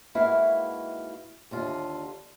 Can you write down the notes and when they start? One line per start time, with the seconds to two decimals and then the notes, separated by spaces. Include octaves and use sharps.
0.15 G#2 A#3 E4 F#4 B4 F5
1.51 D#2 D3 F4